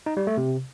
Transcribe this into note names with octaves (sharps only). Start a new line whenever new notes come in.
D#4
G3
A3
C3